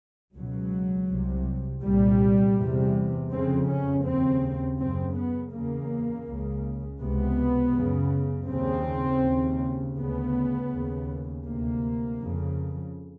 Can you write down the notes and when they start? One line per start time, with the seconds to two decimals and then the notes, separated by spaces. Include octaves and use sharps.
0.36 C#2 B2 F#3
1.10 C2 C3
1.84 C2 A#2 G3
2.58 E2 C3
3.32 F2 C#3 C4
3.69 C#4
4.05 D#2 C#3 C4
4.79 F#2 C#3 C4
5.17 B3
5.54 E2 C#3 A#3
6.28 C#2 C#3
7.01 C#2 C3 B3
7.76 F#2 C#3
8.50 D#2 C#3 C4
9.24 D#2 C#3
9.98 D2 C#3 B3
10.72 D#2 C#3
11.45 D2 C3 A#3
12.20 F2 C#3